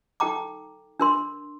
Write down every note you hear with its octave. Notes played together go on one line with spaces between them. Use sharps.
D#4 A4 G5 A#5 D6
D4 A#4 C6